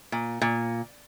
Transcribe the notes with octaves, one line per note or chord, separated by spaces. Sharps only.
A#2
A#2